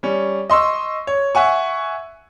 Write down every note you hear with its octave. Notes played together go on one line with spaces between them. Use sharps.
G3 C#4
D#5 C6 C#6 E6
C#5
E5 F#5 G#5 C#6